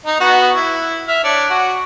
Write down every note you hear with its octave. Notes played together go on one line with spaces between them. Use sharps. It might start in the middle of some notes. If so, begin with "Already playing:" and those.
D#4
B3 F#4
E4
E5 F6
D4 C#5 D5
F#4